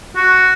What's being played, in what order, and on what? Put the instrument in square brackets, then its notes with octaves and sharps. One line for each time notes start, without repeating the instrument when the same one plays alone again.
[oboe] F#4